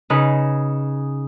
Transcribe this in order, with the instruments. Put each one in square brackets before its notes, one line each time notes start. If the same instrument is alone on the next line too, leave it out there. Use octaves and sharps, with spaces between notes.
[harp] C#3 D#4 B4